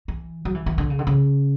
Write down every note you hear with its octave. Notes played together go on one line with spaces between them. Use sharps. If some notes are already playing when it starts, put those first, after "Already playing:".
E3
F#3
E3
E3
D3
C#3
D3
C#3